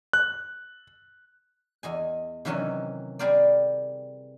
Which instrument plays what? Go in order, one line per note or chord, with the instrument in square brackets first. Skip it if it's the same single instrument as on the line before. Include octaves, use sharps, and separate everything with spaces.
[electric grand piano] F#6
[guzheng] E2 D#5 G#5
C3 D#3 E3 F#3 C#4
G3 C4 G#4 A#4 C5 D5